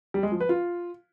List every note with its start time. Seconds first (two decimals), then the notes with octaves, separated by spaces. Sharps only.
0.14 G3
0.23 G#3
0.32 F3
0.40 B4
0.49 F4